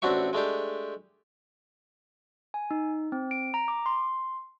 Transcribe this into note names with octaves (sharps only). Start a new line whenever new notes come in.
A1 C4 D4 F#4 E5 C#6
G#3 A3 D4 G4
G#5
D#4
C4
D7
A#5
D6
C6